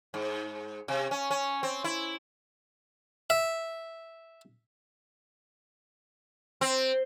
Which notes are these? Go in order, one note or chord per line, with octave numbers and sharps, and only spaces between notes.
G#2
C3
C#4
C#4
C4
E4
E5
C4